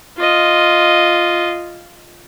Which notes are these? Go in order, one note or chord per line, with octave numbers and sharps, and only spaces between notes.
F4 D#5